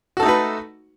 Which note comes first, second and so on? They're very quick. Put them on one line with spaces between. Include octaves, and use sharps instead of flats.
F#4 A4 D#4 A3 B4